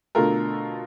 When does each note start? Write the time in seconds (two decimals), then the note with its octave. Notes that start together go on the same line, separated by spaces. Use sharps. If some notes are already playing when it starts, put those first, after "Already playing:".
0.15 B2 D3 A3 F4 A4 A#4